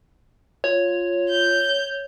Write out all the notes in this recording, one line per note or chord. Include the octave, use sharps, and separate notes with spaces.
F4 C#5
G6